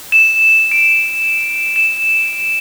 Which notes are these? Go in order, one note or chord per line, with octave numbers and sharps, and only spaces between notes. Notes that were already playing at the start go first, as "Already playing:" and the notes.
E7
D7
E7